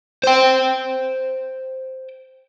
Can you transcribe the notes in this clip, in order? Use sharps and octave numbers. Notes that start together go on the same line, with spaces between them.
C5 G5